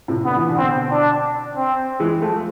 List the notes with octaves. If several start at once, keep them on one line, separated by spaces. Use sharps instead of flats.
A2 C3
D3 B3
E3
B2 D3
C4
D4
C4
E3 G#3
F3 A3